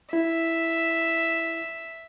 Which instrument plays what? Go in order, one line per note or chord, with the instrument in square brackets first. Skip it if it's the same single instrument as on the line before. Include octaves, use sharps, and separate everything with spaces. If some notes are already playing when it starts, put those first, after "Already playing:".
[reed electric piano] E4 [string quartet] E5